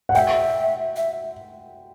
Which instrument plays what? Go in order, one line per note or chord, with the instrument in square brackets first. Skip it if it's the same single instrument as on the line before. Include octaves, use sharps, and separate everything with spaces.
[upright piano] F#5
[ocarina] E5 [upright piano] G5
[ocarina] E5